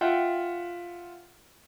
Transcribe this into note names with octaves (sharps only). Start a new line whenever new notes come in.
F4 E5 F#5 G5